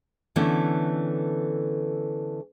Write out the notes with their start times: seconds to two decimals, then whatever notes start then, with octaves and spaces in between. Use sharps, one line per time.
0.36 D3 E3 A3 B3 C#4